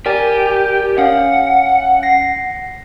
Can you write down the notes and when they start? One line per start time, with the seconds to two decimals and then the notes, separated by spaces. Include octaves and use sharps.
0.06 G4 A#4 D5 G#5
0.98 C#4 F5 F#5
2.03 A#6 C7